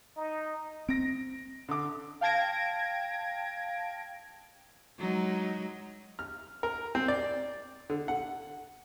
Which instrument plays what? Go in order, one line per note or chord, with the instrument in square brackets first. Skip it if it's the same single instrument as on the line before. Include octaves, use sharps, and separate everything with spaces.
[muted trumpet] D#4
[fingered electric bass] C4 [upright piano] A#6 D7
[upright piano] D3 D6
[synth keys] F5 G5 A5 G#6 A#6 D7
[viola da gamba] F#3 G#3 D#4
[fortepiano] F6
A#4
C4
D5
D3
F#5